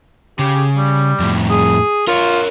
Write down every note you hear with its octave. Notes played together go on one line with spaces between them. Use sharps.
C#3 G4
G3
F2 A2
G#4
F4 A#4 C#5